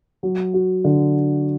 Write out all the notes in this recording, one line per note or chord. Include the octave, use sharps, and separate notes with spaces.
F#3
F#4
D3